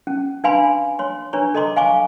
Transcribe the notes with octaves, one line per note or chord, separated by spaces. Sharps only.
C#4
D4 B4 F5 G#5 B5 C6
C#5 C6
D4 B4 C#5 A#5 C#6
A4 D#5 A#5 C6 D6
F5 G#5 C#6 D6